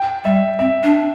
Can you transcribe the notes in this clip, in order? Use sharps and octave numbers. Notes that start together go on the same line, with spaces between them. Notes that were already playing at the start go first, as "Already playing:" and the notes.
Already playing: G5
G3 E5
C4 E5
D4